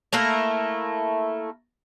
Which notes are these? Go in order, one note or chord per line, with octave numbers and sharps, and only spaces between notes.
A3 A#3 E4 A#4